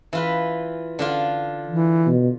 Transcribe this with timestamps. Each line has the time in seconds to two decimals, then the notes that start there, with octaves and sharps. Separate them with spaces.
0.13 E3 F4 B4
0.99 D3 D4 F4
1.67 E3
2.07 B2